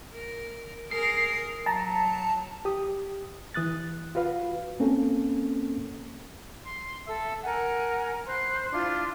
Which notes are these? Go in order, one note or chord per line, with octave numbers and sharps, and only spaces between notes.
A#4
G#4 A#4 C7
F#3 A5 A#5
G4 D#6
E3 D#6 F#6 A6
F4 F#4 B4 F5
A#3 C4 C#4 A4
C6
A4 E5 E6
A#4 F#5 G#5
C5 B5 C6 F#6
D4 E4 F4 C6